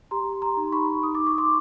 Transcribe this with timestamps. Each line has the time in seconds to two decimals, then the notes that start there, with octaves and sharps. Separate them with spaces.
0.11 G4 A#5 C6
0.42 A#5 C6
0.57 D#4
0.72 B5 C#6
1.03 D#4 D#6
1.15 D6
1.27 C#6
1.38 C6 D6